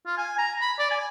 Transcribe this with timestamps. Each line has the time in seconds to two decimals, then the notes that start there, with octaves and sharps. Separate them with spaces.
0.06 F4
0.18 G#5
0.38 A#5
0.61 B5
0.79 D5
0.91 G#5